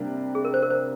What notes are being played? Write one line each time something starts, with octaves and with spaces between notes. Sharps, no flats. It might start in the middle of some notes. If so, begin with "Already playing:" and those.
Already playing: C3 G3 A#3 D4
G#4
A#4
C5
A#4
C5